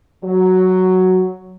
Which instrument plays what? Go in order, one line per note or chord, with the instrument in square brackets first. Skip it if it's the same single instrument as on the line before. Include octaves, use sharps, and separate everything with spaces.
[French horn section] F#3